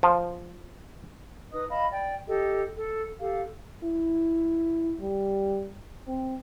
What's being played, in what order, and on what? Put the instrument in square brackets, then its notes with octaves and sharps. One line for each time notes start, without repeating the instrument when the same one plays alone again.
[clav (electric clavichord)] F3
[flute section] D#4 B4 D#5 D#6
D#5 F5 A5 B5
D5 G5
G4 A4 D#5
A4
G4 A4 F5
[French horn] E4
G3
C4